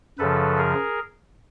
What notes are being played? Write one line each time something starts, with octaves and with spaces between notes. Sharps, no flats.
F#2 C#3 F3 A4 B4
G#4 A#4